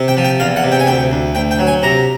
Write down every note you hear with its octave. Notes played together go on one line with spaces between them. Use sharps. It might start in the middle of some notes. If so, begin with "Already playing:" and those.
Already playing: C3
G5
F3
G5
E2 F5
F#5
C3
G5
G#5
D2 G5
D2
D2 G5
G5
F#3
G#5
C3 A#5